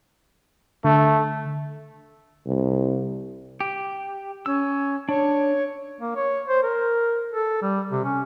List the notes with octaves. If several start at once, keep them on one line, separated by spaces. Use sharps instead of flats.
D3 A3
C2
G4
C#4 E6
D4 C#5
A#3
C#5
C5
A#4
A4
G3
C3
C#4